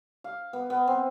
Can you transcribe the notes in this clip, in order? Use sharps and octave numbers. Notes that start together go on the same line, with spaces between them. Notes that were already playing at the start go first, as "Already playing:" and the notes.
F5
B3
B3
C4